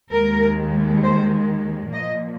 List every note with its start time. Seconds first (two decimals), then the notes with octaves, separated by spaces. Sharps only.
0.12 D#2 D#3 G#3 A#4
1.02 C5
1.93 A#2 F3 A#3 D#5